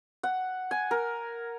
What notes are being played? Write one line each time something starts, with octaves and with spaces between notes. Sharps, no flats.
F#5
G#5
A#4